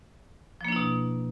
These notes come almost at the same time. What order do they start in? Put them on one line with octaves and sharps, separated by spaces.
F3 A#3 D4 E4 B2